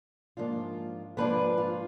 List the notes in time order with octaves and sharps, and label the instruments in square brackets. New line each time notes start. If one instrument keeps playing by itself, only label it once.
[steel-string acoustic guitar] G#2 F3 A#3 D4 F4
G#2 F3 A#3 B3 D4 F4 B4
F4